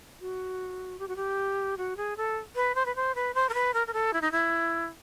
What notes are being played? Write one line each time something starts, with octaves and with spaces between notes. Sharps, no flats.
F#4
G4
F#4
G4
F#4
G#4
A4
B4
C5
B4
C5
B4
C5
A#4
B4
A#4
A#4
A4
E4
D#4
E4